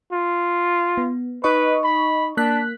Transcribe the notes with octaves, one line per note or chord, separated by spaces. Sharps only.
F4
B3
D#4 B4 D#5 C#6
B5
A#3 D4 F#6 B6